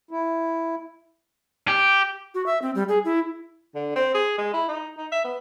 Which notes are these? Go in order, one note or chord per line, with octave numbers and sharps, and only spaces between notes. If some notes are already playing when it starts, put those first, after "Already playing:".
E4
G4
F#4
E5
C4
G3
G#4
E4
D3
C4
G#4
G#3
E4
D#4
D#4
E5
B3